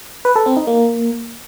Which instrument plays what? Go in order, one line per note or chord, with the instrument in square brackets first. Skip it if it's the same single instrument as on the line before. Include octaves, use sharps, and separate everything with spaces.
[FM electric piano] B4
A4
C4
D#4
A#3